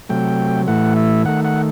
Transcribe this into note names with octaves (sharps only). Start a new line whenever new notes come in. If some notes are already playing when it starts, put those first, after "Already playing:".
C3 F#3 A3 G5
A2 E3 A3 F#5
E5
D#3 A3 F#5
F#5